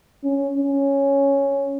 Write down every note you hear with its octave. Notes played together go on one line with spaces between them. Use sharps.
C#4
C#4